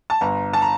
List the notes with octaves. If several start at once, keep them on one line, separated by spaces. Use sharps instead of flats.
A5
G1 A#5
A5
A#5